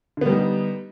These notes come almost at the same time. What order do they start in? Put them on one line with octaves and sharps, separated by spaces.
D3 B3 G3 D#4